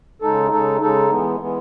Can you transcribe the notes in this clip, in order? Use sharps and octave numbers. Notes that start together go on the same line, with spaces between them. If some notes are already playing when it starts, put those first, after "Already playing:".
C#3 G#3 D#4 A4
C#3 G#3 D#4 A4
C#3 G#3 D#4 A4
E3 G#3 B3
E3 G#3 B3